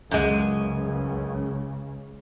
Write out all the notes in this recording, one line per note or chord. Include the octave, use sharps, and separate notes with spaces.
C#2 F#2 C#3 G#3